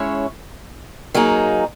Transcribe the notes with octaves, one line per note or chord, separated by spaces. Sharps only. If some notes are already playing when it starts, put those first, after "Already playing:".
Already playing: G#3 C#4 E4 C#5
F#3 A#3 D#4 G#4